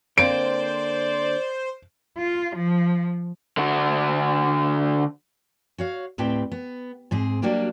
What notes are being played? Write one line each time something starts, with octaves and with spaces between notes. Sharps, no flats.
D3 A#3 C4 C5 D5 D7
F4
F3
D3 F#4
F#4 C#5 F5
D2 A2 C4 G4 B4 G5
B3
G#2 C4 G#4
F#3 G3 A#3 D4 F#4 G4